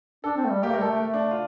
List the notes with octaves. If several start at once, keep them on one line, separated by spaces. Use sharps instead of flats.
D4 A4
C4
A3
G3
A#3 G4
A3 A#4
G3
A3 A4
A3
D4
F4